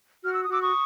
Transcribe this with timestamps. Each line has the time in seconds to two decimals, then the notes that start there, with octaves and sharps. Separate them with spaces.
0.23 F#4 F6
0.33 E6
0.43 D#6
0.49 F#4 D6 E6
0.62 C#6 D#6